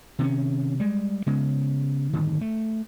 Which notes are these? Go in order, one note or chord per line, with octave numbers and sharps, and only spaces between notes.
C3 D#3 G#3 C#4
G3 G#3
C#3 G#3 B3
D1 G1 D#3
A3